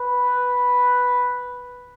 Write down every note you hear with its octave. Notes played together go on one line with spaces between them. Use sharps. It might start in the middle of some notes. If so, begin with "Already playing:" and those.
Already playing: B4